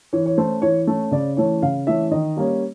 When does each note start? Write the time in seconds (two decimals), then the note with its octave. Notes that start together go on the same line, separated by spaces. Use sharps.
0.13 E3 C#5
0.26 C#5
0.38 A3 C#4 C5
0.62 E3 C#5
0.87 A3 C#4
1.12 C#3 D5
1.37 E3 A3 C#4 C#5
1.62 C#3 F5
1.87 E3 A3 C#4 E5
2.11 D#3 D#5
2.37 G3 A#3 C#4